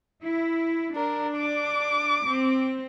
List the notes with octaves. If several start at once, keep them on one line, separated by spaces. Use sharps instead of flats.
E4
D4 A#4
D6
C4